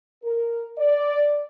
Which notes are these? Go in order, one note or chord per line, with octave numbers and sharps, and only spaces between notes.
A#4
D5